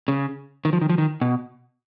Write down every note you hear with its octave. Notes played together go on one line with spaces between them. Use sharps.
C#3
D#3
F3
D#3
F3
D#3
B2